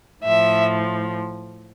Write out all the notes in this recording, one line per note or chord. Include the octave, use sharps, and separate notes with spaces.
A2 F3 E5